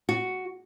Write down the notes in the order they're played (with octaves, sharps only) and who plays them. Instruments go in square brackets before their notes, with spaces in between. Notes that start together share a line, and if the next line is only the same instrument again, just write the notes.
[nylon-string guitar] F#4